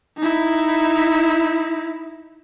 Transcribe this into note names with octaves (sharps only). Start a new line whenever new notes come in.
D#4 E4